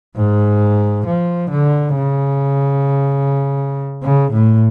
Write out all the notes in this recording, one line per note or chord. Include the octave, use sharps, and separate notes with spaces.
G#2
F3
D3
C#3
C#3
A2